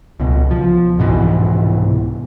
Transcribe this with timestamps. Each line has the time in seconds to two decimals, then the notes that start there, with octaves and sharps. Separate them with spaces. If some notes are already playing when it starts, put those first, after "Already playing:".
0.20 C#2 B2
0.51 F3
0.98 C2 G#2 B2 E3